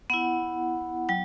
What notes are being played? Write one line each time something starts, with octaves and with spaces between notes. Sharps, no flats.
B3 E4 F#5
F#3 G5